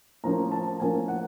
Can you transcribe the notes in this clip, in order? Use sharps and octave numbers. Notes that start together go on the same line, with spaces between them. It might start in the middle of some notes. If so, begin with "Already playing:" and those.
A2 F3 A#3 C#4 A#5
A5
A2 F3 A#3 C#4 G#5
F#5